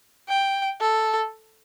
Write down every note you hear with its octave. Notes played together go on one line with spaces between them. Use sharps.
G5
A4